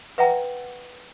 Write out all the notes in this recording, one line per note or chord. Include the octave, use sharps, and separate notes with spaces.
B4 E5 F#5 G5 A#5